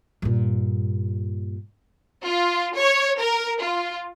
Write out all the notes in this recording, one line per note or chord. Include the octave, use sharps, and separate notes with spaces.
G2 A#2
F4
C#5
A#4
F4